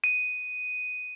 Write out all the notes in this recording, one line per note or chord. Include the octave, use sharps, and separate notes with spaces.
D#7